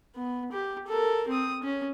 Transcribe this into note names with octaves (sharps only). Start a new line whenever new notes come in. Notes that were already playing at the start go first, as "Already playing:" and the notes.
B3
G4
A4 A#4
C4 D#6
C#4